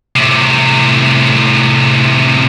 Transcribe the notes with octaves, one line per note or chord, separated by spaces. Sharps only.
A2 C3